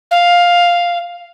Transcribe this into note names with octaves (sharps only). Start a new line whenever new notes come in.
F5